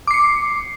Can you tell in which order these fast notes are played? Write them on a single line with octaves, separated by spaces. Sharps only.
D6 C7 C#7